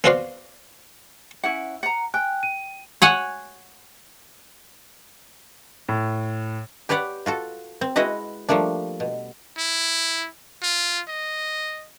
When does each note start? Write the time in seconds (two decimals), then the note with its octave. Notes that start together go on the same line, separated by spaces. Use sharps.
0.04 B3 C4 F4 F#4 D5 F5
1.44 C#4 E4 F#5
1.83 F#5 A#5
2.14 G5 G#5 F#6
2.43 D#7
3.02 C#5 F#5 G#5
5.89 A2
6.89 G4 B4 C#5 D5 F#5
7.26 F4 F#4 A4
7.81 C4
7.96 G#3 E4 F#4 B4 D#5 F#5
8.49 F3 G3 A3 A#3 D4
9.00 B2
9.58 E4
10.63 F4
11.09 D#5